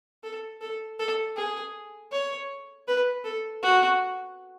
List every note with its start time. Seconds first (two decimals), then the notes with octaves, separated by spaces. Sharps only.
0.24 A4
0.61 A4
0.99 A4
1.37 G#4
2.12 C#5
2.88 B4
3.25 A4
3.63 F#4